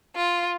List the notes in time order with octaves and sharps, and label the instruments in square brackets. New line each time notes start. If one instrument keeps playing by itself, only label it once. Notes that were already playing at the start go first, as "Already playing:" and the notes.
[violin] F4